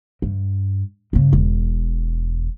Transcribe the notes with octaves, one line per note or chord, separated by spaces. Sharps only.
G2
G2 C#3
E1